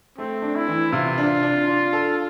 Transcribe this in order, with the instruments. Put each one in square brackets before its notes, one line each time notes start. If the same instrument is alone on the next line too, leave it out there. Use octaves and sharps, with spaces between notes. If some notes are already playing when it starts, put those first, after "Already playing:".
[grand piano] A3 [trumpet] C4
[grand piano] D4
[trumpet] E4
[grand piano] E3
[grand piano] C3 [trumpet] F4
[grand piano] D4
D4
D4
A4